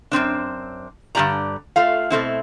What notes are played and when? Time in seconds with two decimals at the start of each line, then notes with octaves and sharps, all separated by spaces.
0.12 F#2 A#2 C4 D4
1.15 G2 D3 D#4 G4 D5 A#5
1.76 A3 F4 F5
2.10 B2 A3 C4 E4